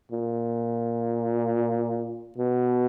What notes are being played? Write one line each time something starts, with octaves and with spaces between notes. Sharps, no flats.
A#2
B2